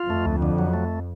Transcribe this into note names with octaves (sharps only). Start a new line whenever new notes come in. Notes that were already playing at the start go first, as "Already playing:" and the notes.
Already playing: F4
F2 A3
D2
D3
F#3
A3